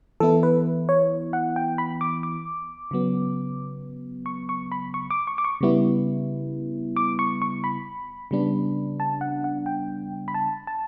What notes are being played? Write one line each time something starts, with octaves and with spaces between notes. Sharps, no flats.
E3 B3 E4 A4
B4
C#5
F#5
G5
B5
D6
D6
C#3 F#3 B3
C#6
C#6
B5
C#6
D6
C#6
D6
C#6
C#3 G3 B3 E4
D6
C#6
C#6
B5
C#3 G3 B3 D4
A5
F#5
F#5
G5
B5
A5
A5